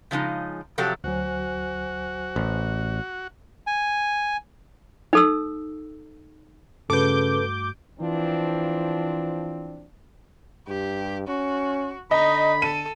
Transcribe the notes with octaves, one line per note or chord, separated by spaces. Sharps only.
C#3 F3 G#3 D#4
C3 F3 F#3 G4 A4
D2 F#3 F#4 C5 G#5
A1
G#5
D#4 A4 E6
G2 C#3 A3 F#4 A4 B4 D6 G6
E3 F3 C4 D4 F4
G2 G4
C#4 F#4
D3 D#4 D#5 B5
A4 D#7